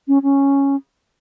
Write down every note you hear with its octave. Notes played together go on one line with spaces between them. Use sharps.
C#4
C#4